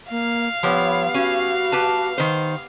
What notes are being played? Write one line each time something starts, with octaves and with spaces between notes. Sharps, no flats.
A#3 F5
F3 G3 B3 C#5
C#4 F#4
G4 B4 A5
D#3 C5